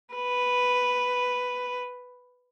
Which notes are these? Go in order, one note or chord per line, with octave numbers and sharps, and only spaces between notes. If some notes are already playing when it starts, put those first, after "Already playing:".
B4